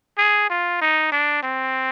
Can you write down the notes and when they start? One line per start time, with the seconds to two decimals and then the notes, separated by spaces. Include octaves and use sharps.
0.18 G#4
0.50 F4
0.81 D#4
1.12 D4
1.43 C4